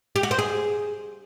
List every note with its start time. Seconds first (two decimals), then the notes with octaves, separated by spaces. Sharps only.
0.16 G4
0.23 F#4
0.31 C5
0.39 G#4